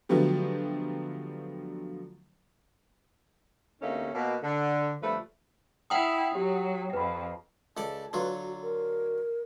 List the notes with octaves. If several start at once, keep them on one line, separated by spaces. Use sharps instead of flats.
D3 F3 F#3 A3 B3 G4
D2 C3 A3 A#3 C#4 D#4
B2 A#3
D3
F2 D3 F3 G3 A3 B4
E4 F#5 G5 A#5 D#6
F#3 G4
F2 B4 B5
C#2 A4 D5 A5
D3 F#3 F4 B4
F#4
A#4